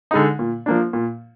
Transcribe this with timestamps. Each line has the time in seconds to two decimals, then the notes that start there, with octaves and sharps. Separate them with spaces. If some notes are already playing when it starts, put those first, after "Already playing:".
0.11 D3 G#3 D#4
0.39 A#2
0.66 F3 A#3 D4
0.93 A#2